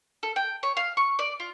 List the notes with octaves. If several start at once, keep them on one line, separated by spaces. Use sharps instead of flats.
A4
G5
C#5
F5
C#6
D5
F4